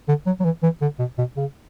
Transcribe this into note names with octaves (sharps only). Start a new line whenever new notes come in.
D3
F#3
F#3
E3
E3
D3
B2
B2
C#3